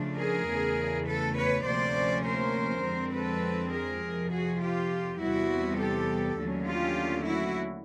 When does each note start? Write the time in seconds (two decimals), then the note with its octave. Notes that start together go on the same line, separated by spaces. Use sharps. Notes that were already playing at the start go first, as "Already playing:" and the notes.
Already playing: C#3 F3 A3 D4
0.18 G#4 A#4
0.47 E2 C#3 E3 A3
1.07 A4 B4
1.36 B4 C#5
1.66 D2 C3 F3 A#3 C#4 C5 D5
2.24 A#4 C5
2.84 F2 D3 F3 G#3 C4
3.13 A4 B4
3.72 G#4 A#4
4.02 F2 C3 F3
4.31 F#4 G#4
4.61 F4 G4
5.20 E2 C3 E3 G3 B3 E4 F#4
5.79 G4 A4
6.38 D#2 D3 F#3 A3 C#4
6.68 F4 G4
7.27 E4 F#4